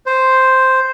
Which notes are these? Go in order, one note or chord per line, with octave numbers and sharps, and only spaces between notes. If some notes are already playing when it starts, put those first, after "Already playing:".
C5